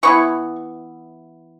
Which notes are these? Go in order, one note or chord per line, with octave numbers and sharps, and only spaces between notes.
E3 B3 E4 C#6